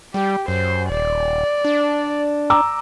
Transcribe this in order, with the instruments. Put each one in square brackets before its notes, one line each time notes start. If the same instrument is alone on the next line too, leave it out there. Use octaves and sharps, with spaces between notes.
[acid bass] G3 [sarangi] G4
[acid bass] F#2 [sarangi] C5
[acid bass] D#1 [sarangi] D5
[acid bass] D4
[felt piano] A#5 D6 E6